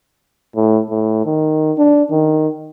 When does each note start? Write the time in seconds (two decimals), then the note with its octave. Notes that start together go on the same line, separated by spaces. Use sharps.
0.56 A2
0.90 A2
1.25 D#3
1.78 D4
2.11 D#3